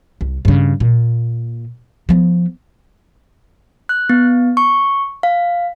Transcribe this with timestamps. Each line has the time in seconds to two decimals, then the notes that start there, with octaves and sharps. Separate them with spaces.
0.21 C2
0.45 G2 C#3
0.80 A#2
2.09 F3 B3
3.89 F#6
4.10 B3
4.57 C#6
5.23 F5